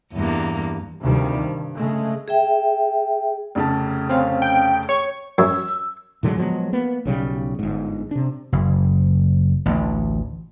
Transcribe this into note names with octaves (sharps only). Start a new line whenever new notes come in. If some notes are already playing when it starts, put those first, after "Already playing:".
E2 G2 A#3
D2 C3 D#3 F3 G3
G2
C#3 G#3 A3
G#4 E5 G5
F1 C#3 A5
C4 C#4 F5
G5
C#5 C#6
F#2 E6
A2 D3 F#3 G#3
F3 F#3 G#3 B3
A#3 B3
B1 C#3 E3 G3
G1 G#2
C3 D4
F#1
A1 D2